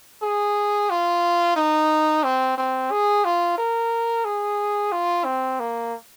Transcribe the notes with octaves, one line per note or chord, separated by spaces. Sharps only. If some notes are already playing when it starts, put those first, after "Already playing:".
G#4
F4
D#4
C4
C4
G#4
F4
A#4
G#4
F4
C4
A#3